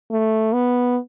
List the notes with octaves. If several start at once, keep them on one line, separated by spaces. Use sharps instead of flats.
A3
B3